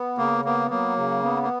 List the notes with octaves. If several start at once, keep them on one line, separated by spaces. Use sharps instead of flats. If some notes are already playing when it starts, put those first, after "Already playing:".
Already playing: B3
C#3 A#3
A#3 B3
F#3 A#3
C#3
B3
A#3